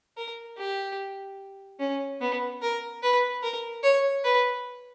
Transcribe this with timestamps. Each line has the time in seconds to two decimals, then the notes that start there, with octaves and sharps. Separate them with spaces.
0.17 A#4
0.58 G4
1.79 C#4
2.21 B3
2.62 A#4
3.03 B4
3.43 A#4
3.84 C#5
4.24 B4